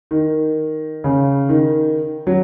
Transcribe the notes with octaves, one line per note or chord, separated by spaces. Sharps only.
D#3
C#3
D#3
F#3